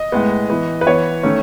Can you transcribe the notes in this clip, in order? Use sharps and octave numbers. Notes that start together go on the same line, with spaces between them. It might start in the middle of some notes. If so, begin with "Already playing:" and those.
Already playing: D#5
A2 G#3 B3
E3 B3
B4
E3 B3 C#5
D#3 A3 C#4